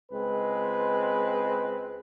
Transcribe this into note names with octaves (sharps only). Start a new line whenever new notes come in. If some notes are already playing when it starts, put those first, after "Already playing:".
C#2 G#3 C4 B4